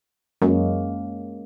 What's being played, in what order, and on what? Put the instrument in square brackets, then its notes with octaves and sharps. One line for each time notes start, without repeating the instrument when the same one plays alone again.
[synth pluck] F#2 [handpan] G#3 A#3 C#4